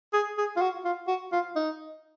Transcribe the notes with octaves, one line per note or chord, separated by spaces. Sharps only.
G#4
G#4
F4
F#4
F4
F#4
F4
D#4